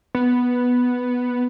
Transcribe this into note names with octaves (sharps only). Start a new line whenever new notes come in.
B3